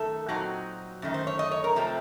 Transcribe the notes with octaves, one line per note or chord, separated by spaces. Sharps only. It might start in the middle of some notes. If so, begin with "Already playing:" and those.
Already playing: F#2 D#3 A3 A4
A#2 F#3 C4 D#4 F#4
F#2 D#3 A3 D#4
C5
C#5
D#5
C#5
A#4
C3 F3 A3 C4